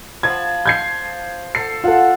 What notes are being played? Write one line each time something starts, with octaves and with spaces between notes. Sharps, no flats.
F3 A5 B5 G#6
G6 G#6 C7
A4 C7
F4 A4 F5 F#5